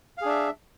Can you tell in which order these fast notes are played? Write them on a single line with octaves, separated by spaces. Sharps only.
F5 G#4 D4 E5